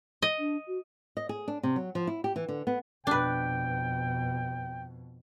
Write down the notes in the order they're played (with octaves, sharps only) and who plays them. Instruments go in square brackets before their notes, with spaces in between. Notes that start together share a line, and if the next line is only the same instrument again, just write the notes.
[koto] D#5
[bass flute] D4
F#4
[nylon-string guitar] D#5
G#4
D4
C3
F#3
F3
E4
G4
E3
D3
B3
[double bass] F2 B2 [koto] D4 B4 [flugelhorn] G5